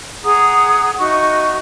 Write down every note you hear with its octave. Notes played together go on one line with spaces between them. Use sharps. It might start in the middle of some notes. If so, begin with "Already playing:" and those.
G#4 F#5 A#5 D#6
D#4 F#4 E5 C#6